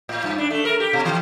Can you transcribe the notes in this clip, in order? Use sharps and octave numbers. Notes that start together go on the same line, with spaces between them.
A2
G2
D4
A3
A#4
G4
B2
E3